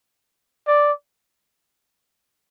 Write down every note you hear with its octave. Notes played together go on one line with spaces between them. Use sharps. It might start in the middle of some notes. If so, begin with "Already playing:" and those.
D5